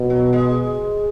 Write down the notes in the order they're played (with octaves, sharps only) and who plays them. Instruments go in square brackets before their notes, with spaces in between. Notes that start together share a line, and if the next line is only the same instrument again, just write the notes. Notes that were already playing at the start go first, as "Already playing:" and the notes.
Already playing: [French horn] B2
[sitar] F#3
G#3